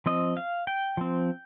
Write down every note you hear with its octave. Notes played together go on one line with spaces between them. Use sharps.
F3 C4 D#5
F5
G5
F3 C4